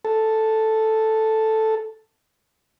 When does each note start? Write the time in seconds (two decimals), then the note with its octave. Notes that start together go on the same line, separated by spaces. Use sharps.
0.05 A4